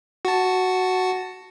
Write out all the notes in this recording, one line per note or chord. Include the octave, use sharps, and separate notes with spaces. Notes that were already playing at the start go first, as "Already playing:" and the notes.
F#4 A5